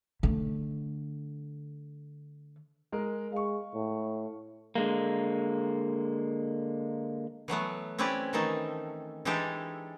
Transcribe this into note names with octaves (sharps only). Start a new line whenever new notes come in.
D3 A3
G#3 G#4 A#4
G#3 F5 C#6
A2
D3 G#3 A#3
E3 F#3 A3 B3
C4 C#4 E4 G4 B4 D5
D#3 E3 A3 D#4 A4
E3 G#3 D4 D#4 G4 A4